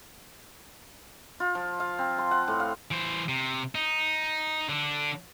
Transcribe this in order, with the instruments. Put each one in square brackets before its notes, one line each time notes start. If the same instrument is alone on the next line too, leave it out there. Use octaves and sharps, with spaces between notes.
[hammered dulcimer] F4
F3
F5
C4
C6
F#5
A2
F5
[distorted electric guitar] E3 C5
C3
D#4
D3 D4